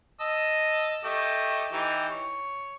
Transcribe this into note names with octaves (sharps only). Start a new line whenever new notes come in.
D#5 A5 E6
A3 G4 D#5
E3 D#4 G4
C#5